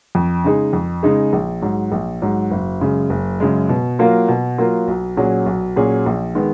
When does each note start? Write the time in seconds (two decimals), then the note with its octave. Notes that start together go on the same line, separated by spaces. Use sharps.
0.15 F2
0.44 C#3 G#3 D#4 G#4
0.73 F2
1.03 C#3 G#3 D#4 G#4
1.33 A#1
1.62 G#2 F#3
1.92 A#1
2.22 G#2 F#3
2.51 F#1
2.81 F#2 C#3 G#3
3.10 F#1
3.40 F#2 C#3 G#3
3.69 B2
3.99 F#3 A#3 F4 A#4
4.28 B2
4.58 F#3 A#3 F4 A#4
4.88 B1
5.17 A#2 F#3 C#4 G#4
5.46 B1
5.76 A#2 F#3 C#4 G#4
6.06 A#1
6.35 D#3 G#3 B3